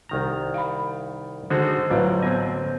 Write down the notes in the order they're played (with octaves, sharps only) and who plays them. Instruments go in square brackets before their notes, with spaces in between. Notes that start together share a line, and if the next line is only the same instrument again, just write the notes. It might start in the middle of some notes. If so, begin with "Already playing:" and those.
[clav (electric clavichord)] C2 D#3 A#5
[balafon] F5 B5
[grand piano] D3 [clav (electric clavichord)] G#3 D#4 F#4 [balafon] C5
[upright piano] A1 F#3 [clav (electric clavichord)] G3 [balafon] B4 F5
[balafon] B3 C5 [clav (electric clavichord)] C4 G#5